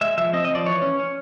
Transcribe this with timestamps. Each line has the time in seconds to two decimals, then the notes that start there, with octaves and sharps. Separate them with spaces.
0.01 G#3 E5
0.18 F3 E5
0.33 C4 D#5
0.45 D#5
0.50 F3 D5
0.66 E3 C#5
0.82 C#4
0.99 C#4